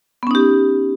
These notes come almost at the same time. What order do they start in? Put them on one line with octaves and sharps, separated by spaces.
B3 C#4 D#4 G4